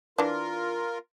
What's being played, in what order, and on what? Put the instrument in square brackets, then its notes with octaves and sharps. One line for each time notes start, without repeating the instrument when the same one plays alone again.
[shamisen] E3 D4 [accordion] F4 A#4